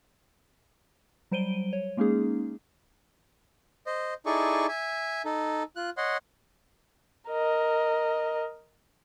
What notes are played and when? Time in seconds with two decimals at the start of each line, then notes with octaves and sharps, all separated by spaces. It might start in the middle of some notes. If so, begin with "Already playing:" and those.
1.31 F#3 G3 C5 D7 D#7 G7
1.73 C#5
1.97 G#3 A#3 C#4 D#4 G#4
3.87 C5 D#5
4.26 D#4 E4 G#4 A4 D5 C#6
4.68 E5 G#5
5.25 D#4 A4
5.76 F4 F#6
5.97 C#5 D#5 F#5 C6
7.29 A#4 D#5